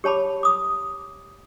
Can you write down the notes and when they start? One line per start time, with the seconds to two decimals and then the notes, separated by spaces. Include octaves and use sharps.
0.04 G4 C#5 A5 B5 D6
0.43 D6 D#6